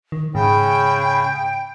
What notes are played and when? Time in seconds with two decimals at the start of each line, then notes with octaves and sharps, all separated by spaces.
0.12 D#3
0.35 G#2 C#3 G5 B5